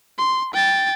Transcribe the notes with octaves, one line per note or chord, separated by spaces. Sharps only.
C6
G5 A6